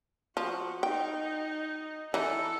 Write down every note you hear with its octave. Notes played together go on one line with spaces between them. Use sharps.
F3 F#4
D#4 G5
E3 D#4 A4